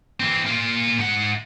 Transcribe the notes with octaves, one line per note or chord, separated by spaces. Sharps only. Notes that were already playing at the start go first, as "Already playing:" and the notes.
E3 C4
A#3 F4
G#2 F#5